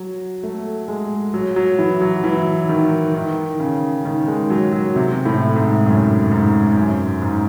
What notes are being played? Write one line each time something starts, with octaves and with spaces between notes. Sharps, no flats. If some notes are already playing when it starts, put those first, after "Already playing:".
Already playing: F#3
A3
G#3
F#3
F#3
E3
F#3
E3
D#3
D#3
C#3
D#3
G#3
F#3
F#3
C3
A2
G#2
F#2
G#2
F#2
G#2